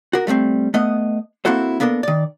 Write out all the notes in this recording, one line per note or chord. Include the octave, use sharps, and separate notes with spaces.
F#4 A#4
G3 A3 A#3 C4
A3 B3 D#5
A#3 C4 E4 F#4 A4 C5
A#3 B3 D4 A4 A#4
D#3 D5